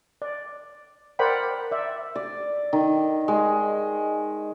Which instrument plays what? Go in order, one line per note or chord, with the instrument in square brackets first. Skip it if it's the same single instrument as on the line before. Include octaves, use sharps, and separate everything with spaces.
[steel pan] D5
A#4 C5 D5 F#5 G5 B5
D5 E5
[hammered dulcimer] D5
D#3
G#3